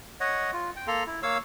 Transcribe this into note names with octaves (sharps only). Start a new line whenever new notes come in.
C#5 D#5 F#5
F4
G5
A#3 A4 A#5 C6
E4
A#3 C#5 F5 E6